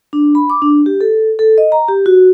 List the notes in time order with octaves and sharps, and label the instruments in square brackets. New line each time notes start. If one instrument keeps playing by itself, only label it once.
[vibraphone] D4
B5
D6
D4
G4
A4
A4
D#5
A#5
G4
F#4